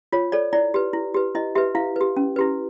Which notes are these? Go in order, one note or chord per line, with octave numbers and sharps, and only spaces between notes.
F4 C#5
A4 C#5 D5
E4 D5
G4 B4
E4
G4 B4
E4 D#5
G4 B4 E5
E4 F5
G4 B4
C#4
E4 G4 B4